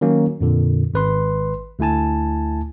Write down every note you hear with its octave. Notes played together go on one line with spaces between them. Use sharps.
D#3 F#3 A#3 C#4
F2 A#2 D3
G#1 B4 C6
D2 A3 E4 G#5 A5